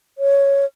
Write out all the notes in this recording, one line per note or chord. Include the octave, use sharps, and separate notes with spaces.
C#5